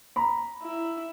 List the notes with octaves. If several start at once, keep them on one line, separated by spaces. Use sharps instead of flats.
A#5 B5
E4